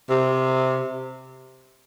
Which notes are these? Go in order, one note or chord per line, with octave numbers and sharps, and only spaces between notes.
C3